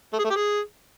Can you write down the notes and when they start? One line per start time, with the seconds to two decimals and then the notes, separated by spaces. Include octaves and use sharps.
0.13 A3
0.19 G#4
0.24 A3
0.30 G4
0.36 G#4